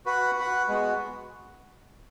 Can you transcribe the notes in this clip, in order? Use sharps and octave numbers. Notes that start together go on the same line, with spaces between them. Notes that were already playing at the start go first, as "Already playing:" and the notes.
F#4 B4 F#5
F#4 B4 F#5
G#3 B3 F#4